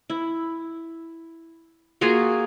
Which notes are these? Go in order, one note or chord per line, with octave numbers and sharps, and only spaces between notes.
E4
A#3 F4 F#4 G#4